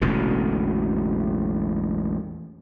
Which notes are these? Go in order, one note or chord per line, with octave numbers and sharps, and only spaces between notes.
E1 A1 B2 D3